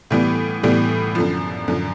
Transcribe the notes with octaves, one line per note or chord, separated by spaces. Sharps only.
A2 E3 G3 B3
A2 E3 G3 B3
F#2 D3 F3
F#2 D3 F3